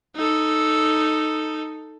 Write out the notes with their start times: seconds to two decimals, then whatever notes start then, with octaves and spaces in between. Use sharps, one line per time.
0.15 D#4 A4